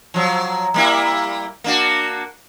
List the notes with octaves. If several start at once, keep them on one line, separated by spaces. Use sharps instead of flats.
F3 F#3
G3 A#3 E4
A#3 D4 F#4